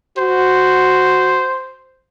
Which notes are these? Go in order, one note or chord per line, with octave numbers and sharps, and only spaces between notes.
F#4 C5